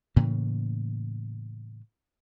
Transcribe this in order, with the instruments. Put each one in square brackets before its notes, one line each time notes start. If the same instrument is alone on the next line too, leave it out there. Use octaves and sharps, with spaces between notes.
[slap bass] A2 C#3 E3 A#3